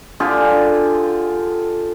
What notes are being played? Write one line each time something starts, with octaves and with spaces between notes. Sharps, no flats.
D3 F4 G4 G#4